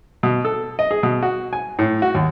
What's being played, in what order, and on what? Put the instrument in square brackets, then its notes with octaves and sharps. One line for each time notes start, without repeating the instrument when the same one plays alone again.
[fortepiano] B2
A4
D#5
G#4
B2
F#4
G#5
A2
F#4
D#2